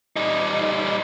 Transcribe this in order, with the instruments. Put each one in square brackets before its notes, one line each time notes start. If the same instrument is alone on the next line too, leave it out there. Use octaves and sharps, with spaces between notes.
[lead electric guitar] G3 D#4